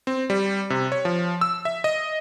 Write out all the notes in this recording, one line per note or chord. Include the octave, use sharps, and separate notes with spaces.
C4
G3
C3
C#5
F3
E6
E5
D#5